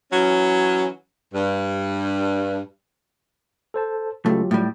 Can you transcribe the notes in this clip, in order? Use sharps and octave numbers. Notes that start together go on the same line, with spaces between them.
E3 F#3 C#4
G2
A4 C5 A5
C#2 F#3 A3 F4 G4
A2 G3